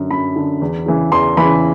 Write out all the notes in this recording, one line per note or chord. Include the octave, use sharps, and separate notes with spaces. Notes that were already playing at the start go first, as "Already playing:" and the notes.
Already playing: F#2 D3
F#2 B5
D3
E2
C#3 E3
E2 C6
C#3 E3 B5